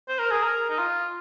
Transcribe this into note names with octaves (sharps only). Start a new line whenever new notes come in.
C5
A#4
G#4
A#4
D#4
F4